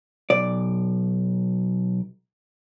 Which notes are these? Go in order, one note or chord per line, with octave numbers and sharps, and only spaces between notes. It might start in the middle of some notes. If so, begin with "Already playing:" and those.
B1 D5